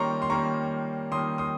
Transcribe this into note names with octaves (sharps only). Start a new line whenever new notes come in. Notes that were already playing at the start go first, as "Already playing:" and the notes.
Already playing: D#3 G3 A#3 C#4 A#5 C6 C#6
C6
D#3 G3 A#3 C#4 A#5 C#6
D#3 G3 A#3 C#4 C6 D#6
C6 D#6